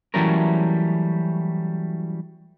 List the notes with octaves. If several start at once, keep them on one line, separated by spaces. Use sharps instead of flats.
E3 F#3 G3 A3 C#4 A#4